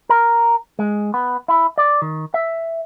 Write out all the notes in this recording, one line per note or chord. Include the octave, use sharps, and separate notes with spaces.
A#4
G#3
B3
E4
D5
D#3
E5